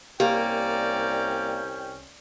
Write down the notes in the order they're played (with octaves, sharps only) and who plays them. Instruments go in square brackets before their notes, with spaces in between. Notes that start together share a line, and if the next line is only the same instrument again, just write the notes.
[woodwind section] C2 C#4 G5 [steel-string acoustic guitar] A#3 [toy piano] G4 [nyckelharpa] D5 A#5